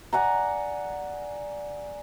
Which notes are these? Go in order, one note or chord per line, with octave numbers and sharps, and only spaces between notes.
D5 F#5 G#5 A#5